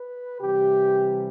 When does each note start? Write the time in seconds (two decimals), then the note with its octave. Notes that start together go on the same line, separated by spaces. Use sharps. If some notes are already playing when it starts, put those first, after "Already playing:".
Already playing: B4
0.41 C3 E3 G3 G4